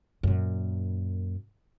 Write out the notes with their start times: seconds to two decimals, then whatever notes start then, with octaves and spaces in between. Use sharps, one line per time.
0.23 F#2 A#2